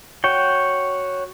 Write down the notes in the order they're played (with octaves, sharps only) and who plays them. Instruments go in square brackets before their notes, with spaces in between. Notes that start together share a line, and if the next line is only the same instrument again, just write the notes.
[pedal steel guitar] F#4 C#5 G5